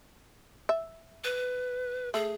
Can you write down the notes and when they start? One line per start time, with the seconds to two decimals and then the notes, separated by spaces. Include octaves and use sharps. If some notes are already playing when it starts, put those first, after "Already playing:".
0.69 E5
1.24 B4
2.14 A3 G#4